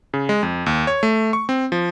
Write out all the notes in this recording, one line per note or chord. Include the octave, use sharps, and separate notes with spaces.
C#3
G#3
F2
D#2
C#5
A3
C#6
C4
F3